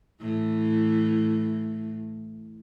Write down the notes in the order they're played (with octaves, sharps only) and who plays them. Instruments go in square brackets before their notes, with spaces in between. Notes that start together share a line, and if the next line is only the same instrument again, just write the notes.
[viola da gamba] A2 E3